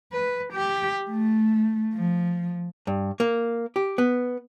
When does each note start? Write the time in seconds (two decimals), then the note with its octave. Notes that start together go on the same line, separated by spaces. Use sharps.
0.12 B4
0.53 G4
1.10 A3
1.94 F3
2.87 G2
3.20 A#3
3.76 G4
3.98 B3